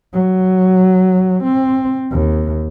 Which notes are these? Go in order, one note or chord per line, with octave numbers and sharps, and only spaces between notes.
F#3
C4
D#2